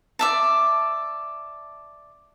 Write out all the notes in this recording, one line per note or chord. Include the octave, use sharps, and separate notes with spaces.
D5 E5 A5